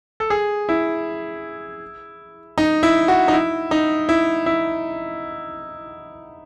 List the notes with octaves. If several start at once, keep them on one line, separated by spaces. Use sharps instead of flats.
A4
G#4
E4
D#4
E4
F#4
D#4
E4
D#4
E4
E4